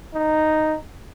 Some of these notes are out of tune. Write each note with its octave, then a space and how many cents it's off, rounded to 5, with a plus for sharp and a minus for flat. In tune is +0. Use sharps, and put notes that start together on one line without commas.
D#4 -5